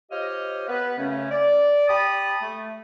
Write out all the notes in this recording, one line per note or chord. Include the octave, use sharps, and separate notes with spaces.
F4 G4 C5 C#5 D#5 F6
B3 B4
F#2 C#3 A3 C#4
D5
G4 A5 B5 D#6
A3